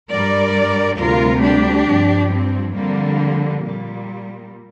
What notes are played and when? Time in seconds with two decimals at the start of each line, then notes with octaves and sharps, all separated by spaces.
0.10 G2 G3 A#4 D5
0.98 D2 C3 G3 F4 A#4
1.42 D4 G4
1.87 G2 F3
2.32 C4
2.75 F2 D3 G3 A#3
3.63 A#2 G3